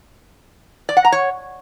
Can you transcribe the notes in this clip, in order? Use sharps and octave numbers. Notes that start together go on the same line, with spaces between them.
D5
F#5
A#5
C#5